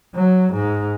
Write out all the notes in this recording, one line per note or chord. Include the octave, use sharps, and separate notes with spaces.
F#3
G#2